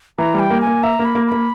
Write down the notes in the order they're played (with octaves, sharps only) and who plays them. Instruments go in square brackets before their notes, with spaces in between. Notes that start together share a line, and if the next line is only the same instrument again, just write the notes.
[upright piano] E3 [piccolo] A#5
[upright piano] G3
[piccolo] G5
[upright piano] A#3
[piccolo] G#5
[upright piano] A#3
[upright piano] E5 [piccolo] A#5
[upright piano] A#3
[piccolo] B5
[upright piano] A#3
[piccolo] B5
[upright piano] A#3